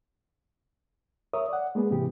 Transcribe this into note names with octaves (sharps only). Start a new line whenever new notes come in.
A#4 C#5 E5 D#6
D5 F#5
G#3 A#3 B3 G#4
G#2 C3 E3 B3 G4